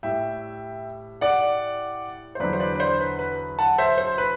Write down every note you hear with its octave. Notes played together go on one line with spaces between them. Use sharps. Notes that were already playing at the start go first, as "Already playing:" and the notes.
A2 G3 E5 G5
D5 F#5
C5
E2 D3 F#3 B4 D5
C5
B4 D5
B4
C5
B4
B4
F#5 A5
C5 E5
C5
B4